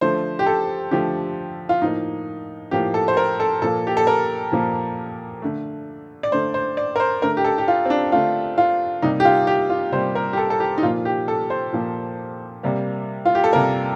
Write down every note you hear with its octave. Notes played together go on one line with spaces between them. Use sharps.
D3 F3 A3 C5
G4
A4
D3 F3 A3 G4
F4
A2 F3 A#3 D#4
A2 F3 A#3 G4
A4
C5
A#4
A4
A#2 F3 A#3 A4
G4
A4
A#4
A#2 F3 A#3
D3 A3
D5
D3 A3 C5
C5
D5
A#4
C5
D3 A3 A#4
G4
A4
G4
F4
C4
D4
D3 A3 F4
F4
C3 G3 A#3 D#4
G4
F4
G4
F4
C3 G3 A#3 C5
A#4
G4
A4
A4
G4
D#4
A#2 F3 A#3 F4
G4
A4
C5
A#2 F3 A#3
C3 G3 A#3
F4
G4
A4
C3 G3 A#3 A#4